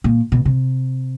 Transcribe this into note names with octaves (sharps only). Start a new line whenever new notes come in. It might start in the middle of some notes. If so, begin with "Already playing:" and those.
A#2
B2
C3